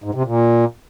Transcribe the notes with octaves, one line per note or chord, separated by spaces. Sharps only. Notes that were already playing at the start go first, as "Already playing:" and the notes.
G#2
C3
A#2